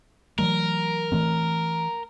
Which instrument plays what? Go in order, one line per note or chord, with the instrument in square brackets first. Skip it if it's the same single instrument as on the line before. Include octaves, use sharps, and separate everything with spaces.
[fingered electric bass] E3 F#3 A3 [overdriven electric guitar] A#4
[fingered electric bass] E3 A3 C4